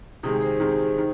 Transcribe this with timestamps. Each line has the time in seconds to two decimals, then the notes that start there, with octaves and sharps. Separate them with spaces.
0.23 C3 D#3 G#3 D#4 G#4
0.41 G#4 C5
0.60 C3 D#3 G#3
0.98 D#3